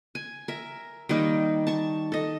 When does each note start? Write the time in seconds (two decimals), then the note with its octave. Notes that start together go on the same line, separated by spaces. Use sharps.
0.15 G#5
0.48 A#4 E5
1.09 D#3 G3 A#3 D#4
1.67 A5 C#6
2.12 A4 D#5